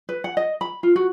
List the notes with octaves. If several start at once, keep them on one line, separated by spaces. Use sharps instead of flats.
B4
F#5
D#5
B5
F4
F#4